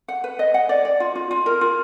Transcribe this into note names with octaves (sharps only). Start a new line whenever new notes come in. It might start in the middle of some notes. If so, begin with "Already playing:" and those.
F#5
B4
D#5
F#5
D5
D5
F4
F4
F4
A#4
F4